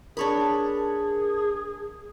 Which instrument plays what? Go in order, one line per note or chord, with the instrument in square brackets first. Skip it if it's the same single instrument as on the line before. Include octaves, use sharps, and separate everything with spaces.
[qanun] D4 C#5 B5 [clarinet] G#4 [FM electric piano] A#4 A5